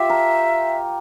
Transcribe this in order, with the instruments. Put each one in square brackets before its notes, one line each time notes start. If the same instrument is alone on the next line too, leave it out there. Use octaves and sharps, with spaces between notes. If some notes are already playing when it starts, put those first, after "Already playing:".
Already playing: [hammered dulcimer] F4 G4 [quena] E5
[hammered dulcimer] A#4